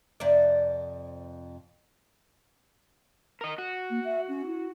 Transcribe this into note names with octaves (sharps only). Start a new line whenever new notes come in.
F2 C3 D5
A#4 D#5
F#4
A#3
E5
C#4
E4